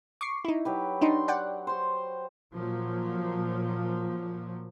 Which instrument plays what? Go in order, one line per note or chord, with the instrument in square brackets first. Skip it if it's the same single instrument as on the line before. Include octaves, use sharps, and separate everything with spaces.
[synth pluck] C#6 D6 C7
D#4 E4
[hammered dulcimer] F#3 G4 B4
[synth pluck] D4 D#4 [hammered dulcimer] C6
[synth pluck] D5 F#5 G5
[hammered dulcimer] C5 C6 C#6
[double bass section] A#2 F3 F#3